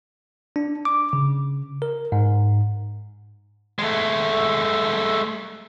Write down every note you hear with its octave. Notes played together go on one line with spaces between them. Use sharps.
D4
D6
C#3
A#4
G#2
G#3 A3